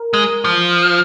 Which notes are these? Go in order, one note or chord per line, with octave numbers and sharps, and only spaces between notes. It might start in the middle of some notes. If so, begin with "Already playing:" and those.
Already playing: A#4
G#3
F3